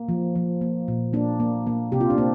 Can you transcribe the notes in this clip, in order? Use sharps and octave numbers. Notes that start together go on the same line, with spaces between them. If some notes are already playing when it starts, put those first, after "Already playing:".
Already playing: A#3
F3
F3
A#3
A#2
A#3 D4
A#3
A#3
C3 G4
F4
D4
A#3 C4